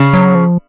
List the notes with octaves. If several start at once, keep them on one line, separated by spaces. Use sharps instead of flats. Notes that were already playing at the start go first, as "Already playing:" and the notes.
Already playing: C#3
F#3
F3